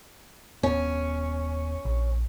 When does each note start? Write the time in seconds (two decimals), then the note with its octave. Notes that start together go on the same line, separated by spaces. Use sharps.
0.63 D#1 B3 C#4
1.85 A#1